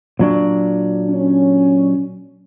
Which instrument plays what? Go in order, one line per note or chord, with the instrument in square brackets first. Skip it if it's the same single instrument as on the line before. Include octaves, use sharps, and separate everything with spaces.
[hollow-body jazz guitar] A#2 F#3 D4
[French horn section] C#4